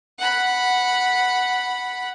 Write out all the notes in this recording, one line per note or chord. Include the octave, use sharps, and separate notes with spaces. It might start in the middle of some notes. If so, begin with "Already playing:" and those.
F#5 B5